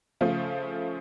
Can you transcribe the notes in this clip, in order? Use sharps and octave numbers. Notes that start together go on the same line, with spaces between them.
C#3 F3 A3 F4